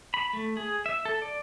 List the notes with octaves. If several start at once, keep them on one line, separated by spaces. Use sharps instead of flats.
B5
A3
G#4
E5
A4
D5